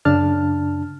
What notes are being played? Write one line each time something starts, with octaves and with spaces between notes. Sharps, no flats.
F#2 C#3 D4 A5 F6